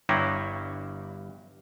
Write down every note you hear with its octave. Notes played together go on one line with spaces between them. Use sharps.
G1 G2 E4 G4 C#5 A#5